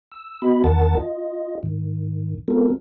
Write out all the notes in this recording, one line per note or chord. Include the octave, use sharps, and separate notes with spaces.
E6
B3 F#4 D#5 B5
E2 D#3 A#4 F#5 A5 A6
F4 D#5
G#2 D#3
G#3 B3 C4 F4 A4 A#4